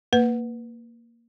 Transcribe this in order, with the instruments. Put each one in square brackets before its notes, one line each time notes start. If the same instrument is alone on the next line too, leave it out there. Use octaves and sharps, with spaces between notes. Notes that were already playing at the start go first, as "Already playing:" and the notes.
[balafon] A#3 B4